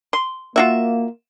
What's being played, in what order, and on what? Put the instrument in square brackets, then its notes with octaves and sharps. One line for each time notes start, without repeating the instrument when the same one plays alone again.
[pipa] C6
[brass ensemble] A#3 [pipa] F4 F#4 E5